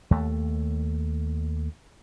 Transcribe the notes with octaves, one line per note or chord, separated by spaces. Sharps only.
D#2 A3